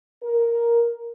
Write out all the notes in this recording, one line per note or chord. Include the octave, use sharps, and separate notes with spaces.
A#4